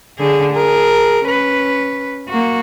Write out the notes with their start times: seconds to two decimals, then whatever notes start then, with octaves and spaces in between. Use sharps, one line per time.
0.19 D3 G#4
0.52 G#4 A#4
1.26 C#4 B4
2.28 A#3 F#4